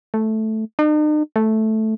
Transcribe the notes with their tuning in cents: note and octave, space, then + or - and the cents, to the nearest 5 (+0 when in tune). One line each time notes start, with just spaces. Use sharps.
A3 -5
D#4 -45
A3 -5